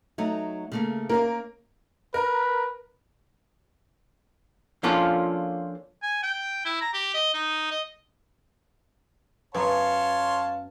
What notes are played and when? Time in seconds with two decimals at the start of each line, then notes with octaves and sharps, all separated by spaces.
0.18 F#3 A3 D#4
0.72 C#3 A3 A#3
1.09 A#3 C#4 A#4 F5
2.14 A#4 B4
4.83 F3 A#3 C#4 D4 F4 A4
6.03 G#5
6.23 G5
6.65 E4
6.81 A#5
6.94 G4
7.14 D#5
7.34 D#4
7.71 D#5
9.55 F#2 B3 B4 C#5 F5 A5 C6